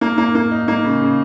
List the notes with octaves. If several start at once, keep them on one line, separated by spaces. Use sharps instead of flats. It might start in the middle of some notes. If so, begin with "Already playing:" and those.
A#3
A#3
A#3
D#4
A#3
C#3
C#3